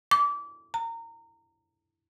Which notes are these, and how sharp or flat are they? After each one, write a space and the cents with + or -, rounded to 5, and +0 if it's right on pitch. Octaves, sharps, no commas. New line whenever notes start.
D6 -25
A#5 -25